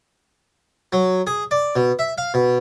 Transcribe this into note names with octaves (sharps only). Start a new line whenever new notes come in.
F#3
G#4
D5
B2
E5
F5
B2